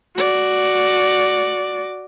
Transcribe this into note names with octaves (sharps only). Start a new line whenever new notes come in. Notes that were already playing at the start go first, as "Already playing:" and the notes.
F#4 D5